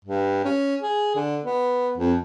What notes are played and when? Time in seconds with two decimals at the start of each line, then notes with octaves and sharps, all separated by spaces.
0.05 G2
0.44 C#4
0.82 G#4
1.15 D3
1.44 B3
1.97 F2